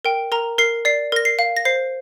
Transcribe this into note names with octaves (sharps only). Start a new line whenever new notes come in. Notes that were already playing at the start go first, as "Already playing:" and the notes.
A#4 G5
A#4 A#5
A#4 C7
D5 C7
A#4 A#6
C7
F5
A#6
C5 C7